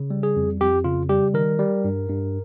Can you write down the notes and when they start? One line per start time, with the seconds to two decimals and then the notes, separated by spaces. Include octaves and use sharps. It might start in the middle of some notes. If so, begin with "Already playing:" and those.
Already playing: C#3
0.10 G3
0.23 G#4
0.36 F2
0.60 F2 G4
0.84 C#3 F4
1.09 G3 G4
1.34 D#3 A#4
1.59 G3
1.84 G2
2.09 G2